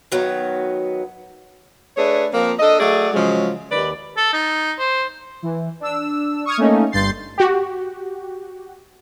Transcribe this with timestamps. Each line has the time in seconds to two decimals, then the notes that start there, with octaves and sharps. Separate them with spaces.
0.12 D#3 F#3 B3
1.97 A3 D4 G#4 B4 C#5
2.34 F3 A#3 C4 A#4
2.59 D4 A4 D#5
2.80 F#3 A3 G#4 D5
3.13 C#3 F3 F#3 G#3
3.72 D#2 D#3 B4 D5
4.17 A4
4.33 D#4
4.78 C5
5.43 E3
5.80 D4 E6
6.45 C#6 D#6 F6 G#6
6.57 A3 A#3 C#4 D#4
6.92 G1 G2 C6 G6 A6 C7
7.38 F#4 G4